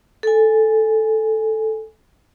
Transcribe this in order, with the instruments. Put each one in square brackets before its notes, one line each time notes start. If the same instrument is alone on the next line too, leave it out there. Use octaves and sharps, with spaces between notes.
[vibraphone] A4 G#5